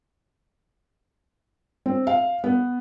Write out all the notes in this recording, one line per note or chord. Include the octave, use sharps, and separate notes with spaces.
C4
F5
B3